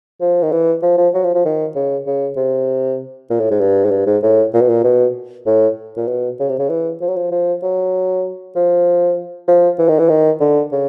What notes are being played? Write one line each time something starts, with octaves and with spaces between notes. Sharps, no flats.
F3
D#3
E3
F3
F3
F#3
F3
F3
D#3
C#3
C#3
C3
A#2
A2
G#2
G2
G#2
G2
G#2
A2
A#2
B2
A#2
B2
A2
A#2
B2
C#3
C3
C#3
E3
F3
F#3
F3
F3
F#3
F3
F3
E3
D#3
E3
D#3
D3
C#3